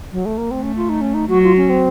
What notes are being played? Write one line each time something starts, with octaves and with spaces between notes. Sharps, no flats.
F#3
A3
A#3
A3 C4
C#4
F4
D#4
C#4
D#4
F#3 F#4
F4
C#4
C4